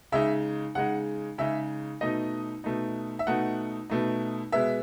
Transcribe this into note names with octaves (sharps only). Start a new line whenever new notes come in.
C#3 G#3 D#4 E5
C#3 G#3 D#4 F#5
C#3 G#3 D#4 E5
B2 A3 D#4 D#5
B2 A3 D#4
E5
B2 A3 D#4 F#5
B2 A3 D#4
B2 G#3 B3 E5